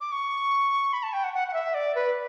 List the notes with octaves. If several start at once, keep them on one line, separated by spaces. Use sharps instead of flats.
D6
C#6
B5
A5
G5
F#5
F#5
F#5
E5
D5
B4